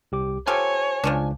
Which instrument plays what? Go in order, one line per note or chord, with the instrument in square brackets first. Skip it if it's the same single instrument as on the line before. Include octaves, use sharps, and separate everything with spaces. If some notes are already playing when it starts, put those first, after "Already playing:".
[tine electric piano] C2 G4 D6
[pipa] F4 G4 A4 [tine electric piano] C5 [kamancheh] C#5 [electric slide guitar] G#5
[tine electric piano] C#2 [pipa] F3 C#4 D4